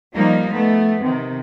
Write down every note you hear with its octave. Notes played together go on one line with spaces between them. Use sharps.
F3 G3 A#3 D#4
A3 B3
C3 D#3